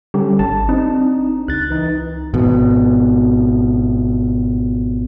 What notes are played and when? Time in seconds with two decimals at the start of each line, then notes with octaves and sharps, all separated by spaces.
0.14 D3 G3 C#4 G4
0.39 G#1 A5
0.69 C4 D4 D#4
1.48 C#2 F#6 A6
1.70 E3 D#4
2.34 G#1 B2